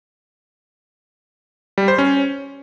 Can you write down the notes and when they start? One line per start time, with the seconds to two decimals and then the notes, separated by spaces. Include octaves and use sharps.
1.78 G3
1.88 C5
1.98 C#4